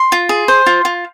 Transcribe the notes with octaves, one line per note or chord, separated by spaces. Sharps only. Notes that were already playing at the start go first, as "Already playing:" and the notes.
Already playing: C6
F4
G#4
C5
F4
F4